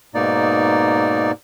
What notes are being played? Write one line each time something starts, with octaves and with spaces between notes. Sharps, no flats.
G#2 B2 A#3 D#4 D5